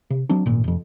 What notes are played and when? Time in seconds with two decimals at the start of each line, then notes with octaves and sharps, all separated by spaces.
0.10 C3
0.29 F#3 C4 D4
0.46 G#1 A#2
0.64 F1 F2